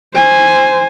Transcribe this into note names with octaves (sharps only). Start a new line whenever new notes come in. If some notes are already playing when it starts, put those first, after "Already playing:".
C5 G#5